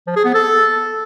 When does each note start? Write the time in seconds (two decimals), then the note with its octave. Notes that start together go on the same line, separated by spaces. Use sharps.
0.07 F3
0.16 G#4
0.25 B3
0.34 A4